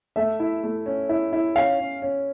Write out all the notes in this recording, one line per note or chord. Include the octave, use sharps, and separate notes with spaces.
A3 E5
E4
A3
C#4
E4
E4
C#4 F5
C#4
C#4